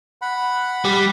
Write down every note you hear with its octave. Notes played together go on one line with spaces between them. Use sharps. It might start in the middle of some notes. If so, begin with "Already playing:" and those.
F#5 B5
G3